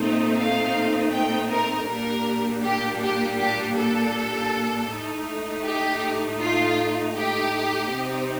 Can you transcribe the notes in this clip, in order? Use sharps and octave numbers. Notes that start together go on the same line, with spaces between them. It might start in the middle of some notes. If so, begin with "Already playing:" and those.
Already playing: A#2 A3 C4 D#4
F5
G5
A#4
A#2 G3 A#3 D4 A#4
G4
G4
G4
A4
A2 A3 D#4
G4
F4
G4
C3 G3 C4 D#4